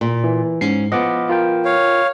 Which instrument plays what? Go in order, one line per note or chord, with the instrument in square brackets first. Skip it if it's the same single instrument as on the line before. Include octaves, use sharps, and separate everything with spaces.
[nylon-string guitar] A#2
[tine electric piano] E3
[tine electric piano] G#2 C7 [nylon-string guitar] C#4
[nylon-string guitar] F3 B3 [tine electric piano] D#5 F#5 D6
[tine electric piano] F4 A#4 G5
[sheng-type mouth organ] C#5 F5